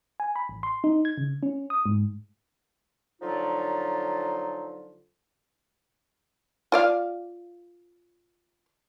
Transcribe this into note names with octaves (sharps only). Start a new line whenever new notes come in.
G#5
B5
A1
C6
D#4
G#6
C#3
C#4
D#6
G#2
D3 F3 F#3 D#4 F4
F4 D5 F5